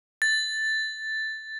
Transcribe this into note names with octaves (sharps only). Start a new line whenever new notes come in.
A6